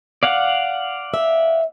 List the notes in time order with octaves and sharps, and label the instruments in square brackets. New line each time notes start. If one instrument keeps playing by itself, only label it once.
[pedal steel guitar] D5 F5 F#5
[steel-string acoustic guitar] E5